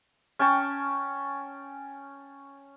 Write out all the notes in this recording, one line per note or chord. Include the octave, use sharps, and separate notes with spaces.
C#4 G5 A5 C#6